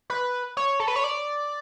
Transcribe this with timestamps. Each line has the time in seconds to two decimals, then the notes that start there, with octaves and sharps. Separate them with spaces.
0.10 B4
0.57 C#5
0.80 A4
0.88 B4
0.96 C#5
1.04 D5